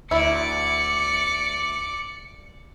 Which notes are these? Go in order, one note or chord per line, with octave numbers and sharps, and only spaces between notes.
D2 E4 D5 D6 C#7